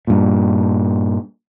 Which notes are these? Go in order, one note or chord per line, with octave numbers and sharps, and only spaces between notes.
G2 A#2